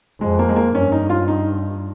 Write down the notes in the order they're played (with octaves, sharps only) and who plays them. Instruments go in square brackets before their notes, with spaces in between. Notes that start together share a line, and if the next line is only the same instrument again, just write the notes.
[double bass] F2 [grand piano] G#3
[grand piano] A#3
G#3
A#3
[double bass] G2 [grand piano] C#4
[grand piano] D#4
F4
D#4